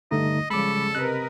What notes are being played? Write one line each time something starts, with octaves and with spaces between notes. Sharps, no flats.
G2 D3 A3 D#4 D#5
C#3 F3 G3 G#3 A4 B5 D6
C3 A#4 B4 D#5 F#6